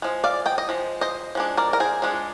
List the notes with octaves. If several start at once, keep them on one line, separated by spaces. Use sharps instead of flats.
F3 G#3
D5 F5
D#5 G5
D#5
F3 G#3
C5 D#5
F3 G#3 D4
A#4 D5
A#4
G#4 C5
F3 G#3 D4